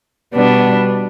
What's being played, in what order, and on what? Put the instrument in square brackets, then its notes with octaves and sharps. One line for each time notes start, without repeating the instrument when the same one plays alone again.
[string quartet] B2 G3 B3 D4